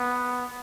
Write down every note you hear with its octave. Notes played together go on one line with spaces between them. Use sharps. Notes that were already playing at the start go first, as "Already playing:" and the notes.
Already playing: B3